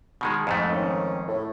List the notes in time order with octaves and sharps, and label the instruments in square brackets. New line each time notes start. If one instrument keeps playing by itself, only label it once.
[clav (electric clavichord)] B2 D#3 G#3
F2 G#2 A3
[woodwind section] D#3 C4 C#4
A2